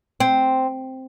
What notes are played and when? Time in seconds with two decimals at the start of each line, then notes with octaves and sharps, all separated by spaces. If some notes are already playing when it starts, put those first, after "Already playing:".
0.20 C4